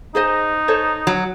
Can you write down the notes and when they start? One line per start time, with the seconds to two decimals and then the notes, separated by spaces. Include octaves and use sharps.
0.15 D#4 G#4 C5 D#5
0.68 A4 C5 C#5
1.07 F#3